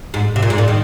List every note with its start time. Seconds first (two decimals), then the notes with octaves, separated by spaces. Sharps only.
0.14 G#2
0.36 C3
0.42 A#2
0.50 G#2
0.58 A#2
0.68 D#3